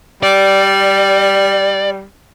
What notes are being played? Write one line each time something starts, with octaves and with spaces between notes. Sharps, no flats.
G3 D5